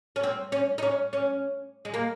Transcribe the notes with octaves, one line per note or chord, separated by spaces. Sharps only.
C#4
C4
C#4
D#4
C#4
C#4
G#3
A#3